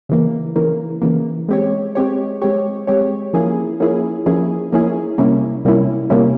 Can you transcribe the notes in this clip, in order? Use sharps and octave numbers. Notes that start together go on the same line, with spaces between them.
C#3 E3 A#3
C#3 E3 A#3
C#3 E3 A#3
G#3 C4 G4 C#5
G#3 C4 G4 C#5
G#3 C4 G4 C#5
G#3 C4 G4 C#5
F3 A#3 C#4 E4 G#4
F3 A#3 C#4 E4 G#4
F3 A#3 C#4 E4 G#4
F3 A#3 C#4 E4 G#4
C3 G3 A#3 C#4 E4
C3 G3 A#3 C#4 E4
C3 G3 A#3 C#4 E4